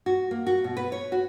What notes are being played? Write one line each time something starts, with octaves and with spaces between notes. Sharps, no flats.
F#4
A#3
F#4
B2
B4
C#5
F#4